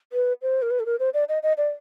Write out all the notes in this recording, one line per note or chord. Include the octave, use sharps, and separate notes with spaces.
B4
C5
A#4
B4
A4
A#4
C5
D5
D#5
D#5
D5